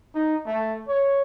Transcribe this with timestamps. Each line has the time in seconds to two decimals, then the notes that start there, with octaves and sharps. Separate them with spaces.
0.15 D#4
0.46 A3
0.88 C#5